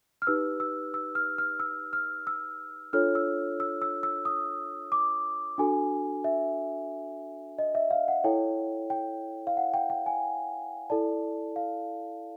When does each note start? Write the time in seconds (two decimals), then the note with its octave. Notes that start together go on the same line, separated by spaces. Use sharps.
0.22 F6
0.27 D#4 G4 B4 E6
0.60 E6
0.94 E6
1.15 F6
1.38 F6
1.60 E6
1.93 F6
2.27 E6
2.93 D4 F4 A4 C#5 F6
3.15 E6
3.60 E6
3.82 E6
4.03 E6
4.25 D#6
4.92 D6
5.58 D4 F#4 A4 G#5
6.24 E5
7.58 D#5
7.75 E5
7.91 F5
8.08 F#5
8.24 E4 A4 C#5 G5
8.90 G5
9.47 F5
9.57 F#5
9.74 G5
9.90 G5
10.06 G#5
10.90 E4 A4 D5 A5
11.56 F5